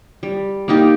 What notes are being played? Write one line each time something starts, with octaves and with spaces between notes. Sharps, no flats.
G3
A#3 D#4 G4